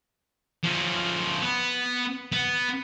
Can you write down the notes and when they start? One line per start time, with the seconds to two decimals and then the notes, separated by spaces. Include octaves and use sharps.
0.64 F3 C#4
1.42 B3
2.32 B3